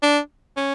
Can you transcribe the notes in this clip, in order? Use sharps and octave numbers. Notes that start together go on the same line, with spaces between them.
D4
C#4